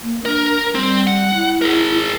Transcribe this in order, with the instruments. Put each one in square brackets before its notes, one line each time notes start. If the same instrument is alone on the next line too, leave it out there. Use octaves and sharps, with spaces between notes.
[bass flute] A#3
[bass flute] D4 [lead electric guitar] A#4
[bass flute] G3 [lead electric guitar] C4
[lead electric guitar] F#5
[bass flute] E4
[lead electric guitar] G#4 A#4